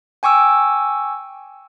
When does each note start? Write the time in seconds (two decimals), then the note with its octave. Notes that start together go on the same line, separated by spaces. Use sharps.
0.23 G5 G#5 C#6 D6 E6